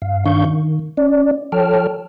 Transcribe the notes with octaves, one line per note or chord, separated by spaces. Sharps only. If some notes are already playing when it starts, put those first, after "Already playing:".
G2 F5
G2 D#3 D4 F5 C#6 G6
D#3
C#4 D5
F3 A4 C#5 G5 A5 F6